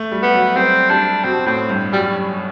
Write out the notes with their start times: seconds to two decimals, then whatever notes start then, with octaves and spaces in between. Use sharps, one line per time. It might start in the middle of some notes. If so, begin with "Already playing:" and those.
Already playing: A3
0.12 G3
0.23 B3
0.34 F#3
0.56 G3 C4
0.90 G3 D4
1.24 B2 C4
1.46 A2 C4
1.69 G2
1.92 F#2 G3